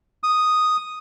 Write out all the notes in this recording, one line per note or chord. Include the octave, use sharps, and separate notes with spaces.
D#6